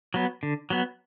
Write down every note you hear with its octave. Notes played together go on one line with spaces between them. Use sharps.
F#3 B3
D3
F#3 B3